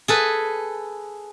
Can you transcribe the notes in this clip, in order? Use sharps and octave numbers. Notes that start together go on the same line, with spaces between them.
G#4 A4 B4